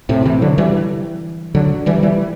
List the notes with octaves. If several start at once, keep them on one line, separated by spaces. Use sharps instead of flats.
A2 C3
C3 E3
D3 F#3
E3 G3
D3 F#3
E3 G3
E3 G3